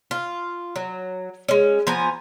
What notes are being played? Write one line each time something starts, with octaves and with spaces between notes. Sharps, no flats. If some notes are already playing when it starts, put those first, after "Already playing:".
F4
F#3
G#3 C#4
F3 B3 G#5 A#5